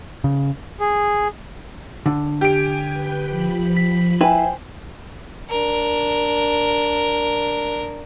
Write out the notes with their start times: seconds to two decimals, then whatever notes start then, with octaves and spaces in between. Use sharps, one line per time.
0.24 C#3
0.80 G#4
2.06 D3
2.41 G4 G#5 D7
2.93 B4 G5
3.28 F3 B5
3.77 B6
4.21 E4 B4 C5 G5 G#5
5.50 D4 A#4